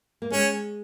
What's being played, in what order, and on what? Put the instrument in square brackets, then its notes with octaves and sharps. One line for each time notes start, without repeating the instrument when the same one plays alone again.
[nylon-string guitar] A#3
[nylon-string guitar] G#3 [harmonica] C#4